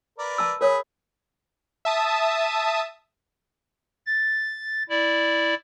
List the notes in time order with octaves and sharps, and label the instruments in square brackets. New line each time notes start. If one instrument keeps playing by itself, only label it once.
[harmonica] A#4 B4 D5
[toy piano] A5 E6
[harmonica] G#4 B5 [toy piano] A#4 C#5
[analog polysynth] E5 A5 D#6
[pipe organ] A6
E4 D5